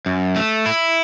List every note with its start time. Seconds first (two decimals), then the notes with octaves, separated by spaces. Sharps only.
0.06 F#2
0.36 A3
0.66 E4